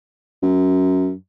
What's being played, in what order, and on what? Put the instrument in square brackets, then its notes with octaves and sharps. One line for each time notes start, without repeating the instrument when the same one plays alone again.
[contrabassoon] F#2